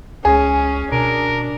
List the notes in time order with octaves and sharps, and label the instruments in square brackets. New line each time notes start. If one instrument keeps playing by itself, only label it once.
[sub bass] C#2 [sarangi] C#4 [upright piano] G#4
[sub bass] B2 [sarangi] D4 [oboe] A#4